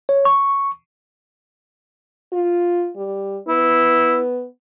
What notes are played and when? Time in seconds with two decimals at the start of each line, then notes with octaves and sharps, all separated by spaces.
0.09 C#5
0.25 C#6
2.32 F4
2.97 G3
3.48 B3 E4